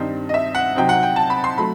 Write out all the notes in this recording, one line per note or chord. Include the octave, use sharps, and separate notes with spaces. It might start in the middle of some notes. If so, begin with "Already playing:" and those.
Already playing: G2 D#3 G3 C4 D#4
D#5
E5
F#5
C3 F#3 C4 D#4 G5
F#5
G5
A5
B5
C6
F#3 A3 B5